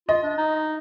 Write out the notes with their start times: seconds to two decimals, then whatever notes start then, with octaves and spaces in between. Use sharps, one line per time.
0.09 F4 D#5
0.23 D4
0.38 D#4